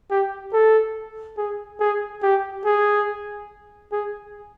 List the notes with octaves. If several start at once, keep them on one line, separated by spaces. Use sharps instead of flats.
G4
A4
G#4
G#4
G4
G#4
G#4